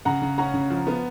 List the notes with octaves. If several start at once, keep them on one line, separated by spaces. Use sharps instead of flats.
C#3 F#5 A#5
C#3
C#4 F#5 A#5
C#3
F3
B3